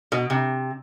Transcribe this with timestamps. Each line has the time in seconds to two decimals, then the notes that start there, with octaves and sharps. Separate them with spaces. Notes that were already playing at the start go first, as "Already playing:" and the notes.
0.12 B2
0.30 C3